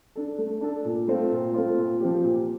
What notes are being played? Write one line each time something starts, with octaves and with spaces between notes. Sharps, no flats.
D4 A4
A3
D4 A4
A#2
A3 C4 F4
A#2
A3 C4 F4
A#2
F3 C4 G4
A#2